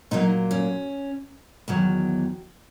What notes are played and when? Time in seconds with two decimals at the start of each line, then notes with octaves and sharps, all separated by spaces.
0.11 A#2 F#3 A#3 D#4
0.51 C#4
1.68 E2 D#3 F#3